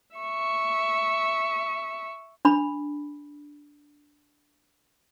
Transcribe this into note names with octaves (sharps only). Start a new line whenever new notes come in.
E5 C#6
D4 B5